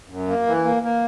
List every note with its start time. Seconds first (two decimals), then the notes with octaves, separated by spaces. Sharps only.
0.09 F#2
0.28 A#3
0.46 E3
0.65 A#3
0.83 A#3